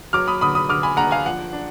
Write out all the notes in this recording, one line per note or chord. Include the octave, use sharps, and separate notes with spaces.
F#3 D6 F6
B5 D#6
D3 B5 D#6
B5 D#6
D3 D6 F6
G#5 B5
D4 F#5 A#5
F5 G#5
F3 F#5
D4